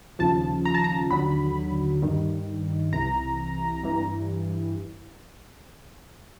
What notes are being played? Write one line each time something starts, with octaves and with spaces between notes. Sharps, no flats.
D#2 C#3 F3 A5
A#5
A5
A#5
D#2 D3 F#3 B5
G2 D#3 G3
C2 C3 E3 A#5
G2 E3 G3